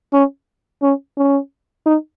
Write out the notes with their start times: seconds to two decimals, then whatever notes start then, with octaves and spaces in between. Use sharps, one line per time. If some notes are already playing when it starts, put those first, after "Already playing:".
0.13 C#4
0.82 C#4
1.17 C#4
1.86 D#4